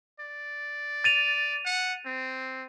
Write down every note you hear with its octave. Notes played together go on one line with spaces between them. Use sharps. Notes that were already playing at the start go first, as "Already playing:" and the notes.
D5
A6 D#7 F7
F#5
C4